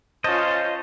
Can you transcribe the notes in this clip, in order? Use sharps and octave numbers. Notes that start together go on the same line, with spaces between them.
C#4 F4 C5 D#5 A5